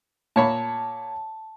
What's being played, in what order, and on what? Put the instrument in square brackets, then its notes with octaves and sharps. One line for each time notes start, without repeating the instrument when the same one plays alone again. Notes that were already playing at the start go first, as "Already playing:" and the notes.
[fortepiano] A#2 C#5 B5 [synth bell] A5